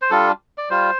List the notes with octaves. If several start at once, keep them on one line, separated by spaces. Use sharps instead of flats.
C5
G3 D4 F4 A4
D5
G3 F4 C5